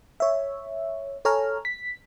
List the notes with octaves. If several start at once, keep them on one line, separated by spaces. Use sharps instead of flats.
C#5 E5
A4 C#5 G#5 A#5 F6
B6